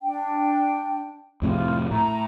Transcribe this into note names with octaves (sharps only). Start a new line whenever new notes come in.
D4 G5
F2 A2 C3 F4 G4
A2 A#5